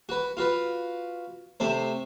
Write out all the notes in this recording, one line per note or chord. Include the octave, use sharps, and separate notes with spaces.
F#4 B4
F4 F#4 B4
C3 A3 C5